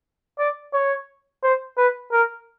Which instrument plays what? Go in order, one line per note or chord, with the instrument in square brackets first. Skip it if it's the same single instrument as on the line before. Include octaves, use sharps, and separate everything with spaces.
[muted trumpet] D5
C#5
C5
B4
A#4